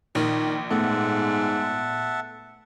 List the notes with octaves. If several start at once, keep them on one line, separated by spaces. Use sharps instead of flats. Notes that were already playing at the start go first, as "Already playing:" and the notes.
A#1 D#3
G#2 A3 B3 A4 E5 F#5 A5